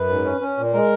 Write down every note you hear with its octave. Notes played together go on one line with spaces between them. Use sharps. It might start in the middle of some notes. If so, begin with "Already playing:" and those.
Already playing: F#2 B4
G#2
C#4
C#4
A#2
G#3 A#4